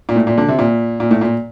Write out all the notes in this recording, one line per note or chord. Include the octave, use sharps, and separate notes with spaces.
A#2
A2
A#2
D3
C3
A#2
A#2
A2
A#2